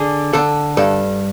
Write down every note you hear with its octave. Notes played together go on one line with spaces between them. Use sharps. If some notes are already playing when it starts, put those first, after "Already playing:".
Already playing: D3 G#4
D3 A4
G2 A4